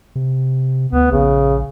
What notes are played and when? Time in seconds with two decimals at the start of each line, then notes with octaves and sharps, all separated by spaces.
0.15 C3
0.92 D2 B3
1.11 A#1 C#3